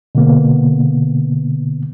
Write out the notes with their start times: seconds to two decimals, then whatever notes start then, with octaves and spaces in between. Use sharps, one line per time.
0.15 B2 D3 A#3 B3